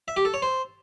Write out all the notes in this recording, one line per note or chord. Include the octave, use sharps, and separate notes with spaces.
E5
G4
A4
C#5
C5